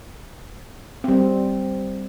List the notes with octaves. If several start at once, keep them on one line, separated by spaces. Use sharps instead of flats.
G3 C4